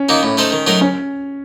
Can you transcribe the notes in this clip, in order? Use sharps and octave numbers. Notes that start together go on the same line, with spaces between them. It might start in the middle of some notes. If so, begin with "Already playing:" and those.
Already playing: C#4
D#3 A#3 D#4 F#4
A2
A3 D#4 A4 C5
D#3
F#3 A3 D#4 A#4
C#4